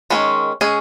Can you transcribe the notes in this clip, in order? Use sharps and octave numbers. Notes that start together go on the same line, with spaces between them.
D#3 G#3 C#4
G#3 C#4 G#4